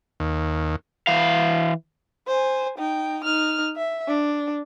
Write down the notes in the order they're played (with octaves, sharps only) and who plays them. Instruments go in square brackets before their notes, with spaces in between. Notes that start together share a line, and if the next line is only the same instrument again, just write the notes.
[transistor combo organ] D#2
[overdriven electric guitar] E3 F5
[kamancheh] C5 G#5
D#4 G5
D#4 F6
E5
D4